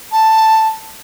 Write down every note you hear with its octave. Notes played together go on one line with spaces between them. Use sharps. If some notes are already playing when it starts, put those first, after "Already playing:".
A5